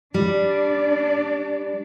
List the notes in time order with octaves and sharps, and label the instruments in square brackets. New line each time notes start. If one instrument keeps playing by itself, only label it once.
[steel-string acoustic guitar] G3 [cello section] D4 D5